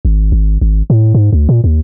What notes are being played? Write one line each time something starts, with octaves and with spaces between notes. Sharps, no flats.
G#1
G#1
G#1
A2
G#2
D2
A#2
D#2